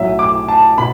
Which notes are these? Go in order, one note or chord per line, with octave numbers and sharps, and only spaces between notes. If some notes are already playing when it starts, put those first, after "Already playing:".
Already playing: B1 A2 F#3 E5
D6
A5
B2 B5